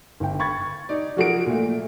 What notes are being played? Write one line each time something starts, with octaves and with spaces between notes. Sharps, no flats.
G1 G5
B5 C#6 G#6 A6
D#4 D5
F3 F#3 F#4 G#4 A#4 D7
A#2 A3